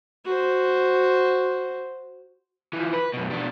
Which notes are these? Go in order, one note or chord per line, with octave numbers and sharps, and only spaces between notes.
F#4 C5
E3 F3
B4
F#2 B2
B2 D4